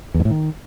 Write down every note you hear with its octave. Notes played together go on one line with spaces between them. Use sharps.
E2
G#2
A2
D#3